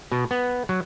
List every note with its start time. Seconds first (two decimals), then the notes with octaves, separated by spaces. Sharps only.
0.12 B2
0.31 B3
0.69 F#3